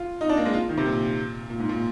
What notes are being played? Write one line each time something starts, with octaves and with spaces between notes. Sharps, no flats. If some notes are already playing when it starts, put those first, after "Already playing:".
Already playing: F4
D#4
D4
A#3
G#3
F4
D#3
C3
A#2
A#2
G#2
A#2